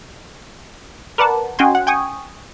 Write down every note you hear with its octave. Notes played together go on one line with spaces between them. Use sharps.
A#4 B4 D5 F#5 A5
C#4 F#4 D#5 G5 G#5 C6
F#5
G5 G#5 C#6 D#6